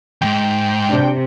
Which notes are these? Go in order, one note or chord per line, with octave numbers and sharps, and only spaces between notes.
F2 G#2 G5
C3 D4